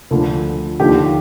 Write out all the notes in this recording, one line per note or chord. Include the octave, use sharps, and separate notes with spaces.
D2 D3 F3
D#2 D3 F3 G4